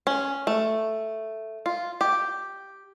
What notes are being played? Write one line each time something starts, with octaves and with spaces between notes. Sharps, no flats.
C#4
A3
F4
G4